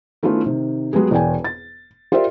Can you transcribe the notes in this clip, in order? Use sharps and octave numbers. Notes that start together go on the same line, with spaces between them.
D#3 A3 B3 C#4 E4 F4
C3 D#3
F#3 G#3 B3 G4 G#4
E1 E2 D5 G5 G#5
A6
F4 G4 A#4 C5 D5 E5